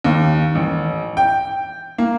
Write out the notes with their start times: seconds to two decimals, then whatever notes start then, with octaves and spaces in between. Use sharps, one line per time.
0.04 D#2
0.55 A1
1.17 G5
1.98 A#3